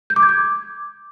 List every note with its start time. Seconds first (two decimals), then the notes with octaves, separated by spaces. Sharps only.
0.10 G6
0.16 D6
0.23 G#6
0.29 D6